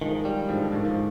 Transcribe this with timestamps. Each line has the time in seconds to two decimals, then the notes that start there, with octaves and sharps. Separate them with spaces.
0.01 D#3 F3 G#3
0.25 G3
0.48 G#2 D3 F3
0.64 D3
0.73 G#2 D#3
0.85 F3